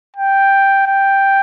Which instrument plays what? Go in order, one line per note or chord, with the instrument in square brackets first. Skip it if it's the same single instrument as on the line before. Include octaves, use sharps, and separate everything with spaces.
[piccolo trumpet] G5
G5